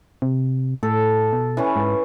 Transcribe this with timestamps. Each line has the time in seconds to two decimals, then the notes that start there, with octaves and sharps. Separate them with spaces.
0.22 C3
0.83 A2 A4
1.33 B2
1.57 E3 C#4
1.76 G#2